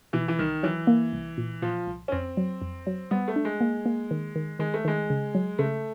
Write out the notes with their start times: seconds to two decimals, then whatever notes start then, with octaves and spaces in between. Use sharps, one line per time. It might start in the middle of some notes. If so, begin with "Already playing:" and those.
0.13 B2 E3
0.28 E3
0.39 C2 D#3
0.63 E3 F#3
0.87 A#3
1.13 C2
1.38 A#2
1.62 A#2 F3
1.87 C2
2.08 C#4
2.12 F2 C4
2.37 F#3
2.62 F2
2.87 F#3
3.11 G3 B3
3.28 A3
3.36 D4
3.45 G#3
3.60 A#3
3.86 A#3
4.11 D#3
4.36 D#3
4.59 D#3 G#3
4.74 A3
4.85 D#3 G#3
5.10 C#3
5.35 F#3
5.59 C#3 A3